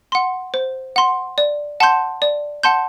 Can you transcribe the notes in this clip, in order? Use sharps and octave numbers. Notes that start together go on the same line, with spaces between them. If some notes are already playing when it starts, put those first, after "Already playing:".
F#5 C6
C5
F#5 C6
D5
F#5 A5 C6 G6
D5
F#5 A5 C6 G6